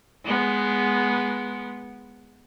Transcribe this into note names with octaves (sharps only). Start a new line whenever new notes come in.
G#3 B3